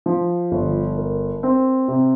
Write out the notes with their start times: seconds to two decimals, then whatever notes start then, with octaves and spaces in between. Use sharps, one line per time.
0.06 F3
0.52 G1
0.97 A#4
1.43 C4
1.88 C3